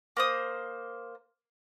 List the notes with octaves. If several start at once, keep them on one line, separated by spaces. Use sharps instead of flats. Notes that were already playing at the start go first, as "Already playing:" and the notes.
A#3 C5 D#6